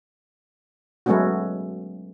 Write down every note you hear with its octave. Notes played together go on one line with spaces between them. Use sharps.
F#3 G#3 A3 B3 C#4 F#4